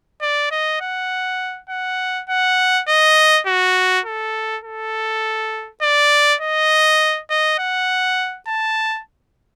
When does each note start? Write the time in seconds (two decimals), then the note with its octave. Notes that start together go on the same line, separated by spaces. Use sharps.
0.22 D5
0.51 D#5
0.81 F#5
1.70 F#5
2.29 F#5
2.88 D#5
3.47 F#4
4.05 A4
4.64 A4
5.82 D5
6.41 D#5
7.30 D#5
7.59 F#5
8.48 A5